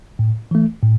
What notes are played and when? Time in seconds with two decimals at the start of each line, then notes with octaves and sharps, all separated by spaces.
0.19 A2
0.51 E3 A3
0.83 A2